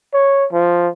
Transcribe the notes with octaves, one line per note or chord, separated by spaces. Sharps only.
C#5
F3